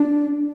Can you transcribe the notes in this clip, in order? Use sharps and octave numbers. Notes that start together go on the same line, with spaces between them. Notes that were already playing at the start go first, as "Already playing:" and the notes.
Already playing: D4